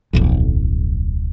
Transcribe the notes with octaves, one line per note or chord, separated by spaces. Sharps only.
D1 B1 F2